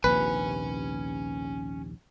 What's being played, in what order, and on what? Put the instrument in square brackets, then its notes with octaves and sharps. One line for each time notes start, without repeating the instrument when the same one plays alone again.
[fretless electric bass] A#1 D#2 C3 [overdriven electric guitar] C#4 G#5 [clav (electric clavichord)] B4